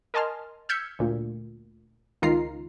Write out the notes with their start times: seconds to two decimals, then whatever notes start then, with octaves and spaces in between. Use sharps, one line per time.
0.14 A#4 D#5 G#5 A5 C6 F6
0.69 E6 F6 G6 G#6 B6 C#7
0.99 D2 A#2
2.22 C#2 D#3 D#4 F4 A#5 C7